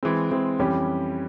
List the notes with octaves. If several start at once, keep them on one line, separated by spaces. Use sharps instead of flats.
E3 G#3 C4
E3 G#3 C4
F2 E3 G3 C#4 G4